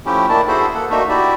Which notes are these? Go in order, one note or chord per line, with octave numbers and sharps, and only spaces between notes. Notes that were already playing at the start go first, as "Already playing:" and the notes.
F3 A3 C#4 E4 G4
D#3 A#3 D4 E4 A5
E4 F#4 G#4 A4 C5 E5
A#3 A4 F#5
A3 A#3 D4 D#4 F#4 E5
E4 F#4 G4 D5 E5